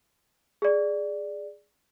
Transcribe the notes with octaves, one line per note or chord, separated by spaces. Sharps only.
G#4 D5